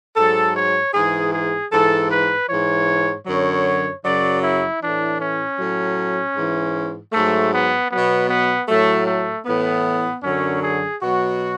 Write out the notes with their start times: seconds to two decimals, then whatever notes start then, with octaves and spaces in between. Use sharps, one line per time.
0.16 G#2 F#3 A4
0.56 C#5
0.94 G#2 E3 G#4
1.32 G#4
1.71 G#2 E3 A4
2.10 B4
2.48 G#2 E3 C#5
3.26 F#2 D3 F#3 C#5
4.03 F#2 C#3 F#3 D5
4.42 E4
4.81 A2 E3 D4
5.20 C#4
5.58 A2 F#3
6.36 G#2 E3
7.13 G#2 F#3 A3
7.53 B3
7.91 B2 F#3 B3
8.29 B3
8.68 A2 F#3 A3
9.06 A3
9.46 A2 E3 B3
10.23 F#2 D3 F#3 C#4
10.62 G#4
11.00 B2 F#3 F#4